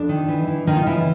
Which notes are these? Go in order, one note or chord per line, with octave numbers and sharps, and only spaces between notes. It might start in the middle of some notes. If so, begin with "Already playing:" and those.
Already playing: F2 D4
D#3
E3
E3
D#3 F3 D#4
F4
C#3 E3 E4